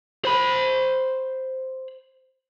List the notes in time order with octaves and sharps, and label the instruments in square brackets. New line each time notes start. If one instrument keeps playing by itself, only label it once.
[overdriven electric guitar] C5 B5